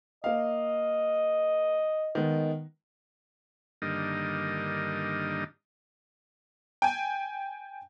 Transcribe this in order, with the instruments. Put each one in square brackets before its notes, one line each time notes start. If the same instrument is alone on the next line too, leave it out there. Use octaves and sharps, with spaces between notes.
[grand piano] A#3 F5 [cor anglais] D#5
[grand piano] D#3 G#3 B3
[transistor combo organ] G2 D3 D#3 G3 A#3 D#5
[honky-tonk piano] G5 G#5